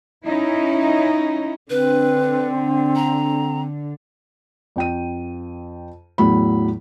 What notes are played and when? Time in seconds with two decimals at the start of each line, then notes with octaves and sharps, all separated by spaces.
0.24 C#4 D#4 E4
1.70 D3 C4 B4
2.96 A#5
4.76 F2 G5 D#7
6.18 E2 A2 F#3 B5